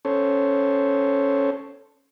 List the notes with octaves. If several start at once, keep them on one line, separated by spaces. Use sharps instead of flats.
C#4 A4 C5 C#5